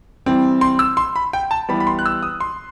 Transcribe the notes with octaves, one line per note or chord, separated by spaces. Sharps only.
E3 G3 C4
C6
E6
C6
B5
G5
A5
E3 G3 B3 B5
B5
C6
F#6
E6
D#6
C6